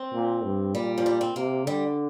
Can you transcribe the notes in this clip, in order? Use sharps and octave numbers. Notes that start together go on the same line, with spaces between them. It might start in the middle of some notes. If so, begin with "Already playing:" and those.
Already playing: C4
A#2
G2
A#2 G3
F3
G3
C4
C3 A#3
D3 G3